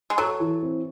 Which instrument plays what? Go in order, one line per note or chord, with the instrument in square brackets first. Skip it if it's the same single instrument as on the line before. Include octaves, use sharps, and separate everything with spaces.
[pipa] G#3
[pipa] F#3 [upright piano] A4
[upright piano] E3
C4